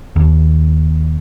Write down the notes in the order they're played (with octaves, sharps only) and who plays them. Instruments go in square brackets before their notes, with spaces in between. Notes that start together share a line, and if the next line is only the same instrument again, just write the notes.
[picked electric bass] D#2